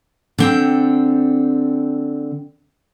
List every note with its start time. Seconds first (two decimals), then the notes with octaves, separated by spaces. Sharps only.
0.38 D3 C4 G5